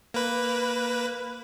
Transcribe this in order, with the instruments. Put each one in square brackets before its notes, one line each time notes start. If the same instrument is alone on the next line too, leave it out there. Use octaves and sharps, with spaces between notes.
[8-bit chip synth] A#3 B4